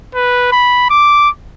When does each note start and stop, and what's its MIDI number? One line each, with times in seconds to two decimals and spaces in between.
0.15 0.47 71
0.52 0.86 83
0.90 1.29 86